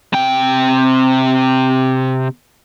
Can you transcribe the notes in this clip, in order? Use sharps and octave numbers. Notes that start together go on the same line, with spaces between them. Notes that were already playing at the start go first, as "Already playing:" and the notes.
C3 G5